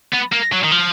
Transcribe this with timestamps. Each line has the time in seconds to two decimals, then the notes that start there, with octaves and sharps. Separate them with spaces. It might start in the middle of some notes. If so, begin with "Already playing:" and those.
0.13 B3
0.32 A#3
0.52 F#3
0.64 D#3
0.72 F3